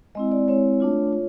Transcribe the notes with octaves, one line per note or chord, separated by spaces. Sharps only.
G#3 C4 E4 D#5
D5
G#3 C4 E4 C#5
A3 D4 F4
F4